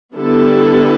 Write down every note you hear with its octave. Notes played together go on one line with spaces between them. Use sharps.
D3 G3 B3 E4 A4